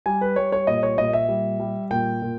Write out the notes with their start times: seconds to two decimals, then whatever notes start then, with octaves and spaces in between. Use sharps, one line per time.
0.06 G3 G#5
0.21 B4
0.36 G3 C#5
0.52 C#5
0.67 A#2 D#5
0.83 C#5
0.98 A#2 D#5
1.13 E5
1.29 G3
1.60 G3
1.91 A#2 G5
2.22 A#2